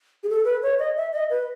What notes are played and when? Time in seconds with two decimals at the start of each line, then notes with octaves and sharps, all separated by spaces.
0.23 G#4
0.29 A4
0.45 B4
0.63 C#5
0.79 D#5
0.96 E5
1.13 D#5
1.30 B4